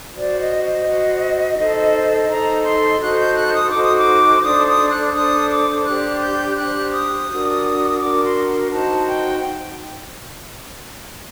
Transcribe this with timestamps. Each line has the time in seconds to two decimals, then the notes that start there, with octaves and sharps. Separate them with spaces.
0.14 F#4 C5 D5
0.38 D#5
0.62 D#5
0.86 F#4 C5
1.57 D#4 A4 C5
2.28 D#4 A4 C5 A#5
2.64 C6
3.00 D#4 F#4 A4 C5 F#6
3.18 G6
3.36 F#6
3.53 D#6
3.71 D#4 F#4 A4 C5 D6
3.84 D#6
3.97 D6
4.43 D4 A4 C5 D#6
4.67 D#6
4.90 F#6
5.14 D4 A4 C5 D#6
5.50 D6
5.85 D4 G4 C5 F#6
6.22 G6
6.57 D4 G4 C5 F#6
6.92 D#6
7.28 D4 F#4 A#4
8.00 D4 F#4 A#4 D6
8.24 C6
8.71 D#4 F#4 C5 A5
9.07 G5